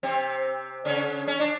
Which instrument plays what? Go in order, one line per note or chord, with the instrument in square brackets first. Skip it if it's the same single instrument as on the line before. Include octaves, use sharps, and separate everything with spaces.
[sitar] C3 C4
C#3 C#4
C#4
D4